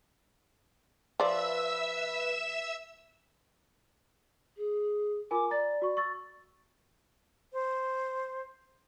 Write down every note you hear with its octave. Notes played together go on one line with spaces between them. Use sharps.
F3 B4 D5 E5 E6
G#4
F4 A#4 G#5 D6
D5 A#5 A6
F#4 C#6
C#6 E6 A6
C5